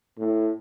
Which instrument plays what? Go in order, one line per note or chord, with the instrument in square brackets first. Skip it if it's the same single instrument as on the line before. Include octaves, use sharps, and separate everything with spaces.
[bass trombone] A2